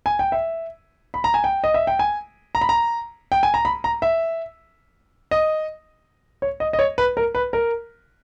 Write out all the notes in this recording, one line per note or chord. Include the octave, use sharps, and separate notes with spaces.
G#5
G5
E5
B5
A#5
G#5
G5
D#5
E5
G5
G#5
A#5
B5
A#5
G5
G#5
A#5
B5
A#5
E5
D#5
C#5
D#5
D#5
C#5
B4
A#4
B4
A#4